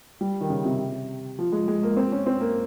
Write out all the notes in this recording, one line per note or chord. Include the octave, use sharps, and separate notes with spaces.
G3
D#3
C#3
C3
F3
G#3
G#3
A#3
C4
C#4
C4
A#3